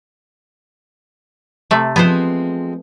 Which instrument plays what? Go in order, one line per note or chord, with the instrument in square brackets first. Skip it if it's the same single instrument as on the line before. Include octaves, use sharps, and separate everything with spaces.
[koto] C3 A3
[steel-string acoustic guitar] F3 G#3 C4 [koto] B3 C5